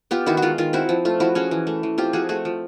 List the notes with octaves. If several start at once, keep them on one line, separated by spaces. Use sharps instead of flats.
B3 F4 G4
D#3 E4 F#4
F#4
G#3 F4
D#3 F4
C4 E4 F#4
F3
A3 F4
F3 E4 F#4
C#4 F#4 G#4
E3
A3
E3
C4 F4 G4
F3 F#4 G#4
A3 F#4 G#4
F3